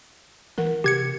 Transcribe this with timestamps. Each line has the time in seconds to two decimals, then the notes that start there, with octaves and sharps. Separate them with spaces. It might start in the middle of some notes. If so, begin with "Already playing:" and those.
0.58 E3 A#4 F#5
0.84 C3 G4 G#6 C#7